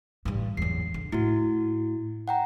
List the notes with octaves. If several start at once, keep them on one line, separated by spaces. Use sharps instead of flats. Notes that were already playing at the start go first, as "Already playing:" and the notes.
A1 G2
E2 F#3 C7
D3
A2 E4 F#4
F#5 G5 A#5